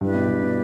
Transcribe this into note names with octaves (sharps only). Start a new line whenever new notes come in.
G2 E4 G4 B4 D5
B2
G2
B2